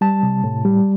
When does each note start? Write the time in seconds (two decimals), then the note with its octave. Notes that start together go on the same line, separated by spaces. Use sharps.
0.01 G3 A5
0.23 C3
0.44 A2
0.65 G3